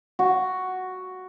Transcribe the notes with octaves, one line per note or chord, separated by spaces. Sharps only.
F#4